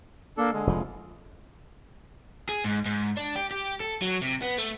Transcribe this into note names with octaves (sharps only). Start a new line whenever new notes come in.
A#3 D4 A4
D3 G#3
F1 F3
G#4
G#2
G#2
D4
G4
G4
A4
F#3
C3
B3
A3